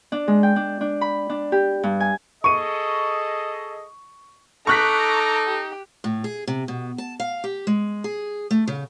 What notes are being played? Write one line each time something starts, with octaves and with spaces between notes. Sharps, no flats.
D4
G#3
G5
D4
D4
B5
D4
G4
G2
G#5
G#4 A4 D#5 C#6 D#7
D#4 A4 A#5 C#6 D6 F#6 B6
G4
A2
G#4
C3
B2
A5
F5
G4
G#3
G#4
A3
C#3